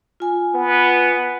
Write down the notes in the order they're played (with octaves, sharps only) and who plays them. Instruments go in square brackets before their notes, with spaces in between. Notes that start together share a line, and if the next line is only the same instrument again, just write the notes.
[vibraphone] F4 G#5
[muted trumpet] B3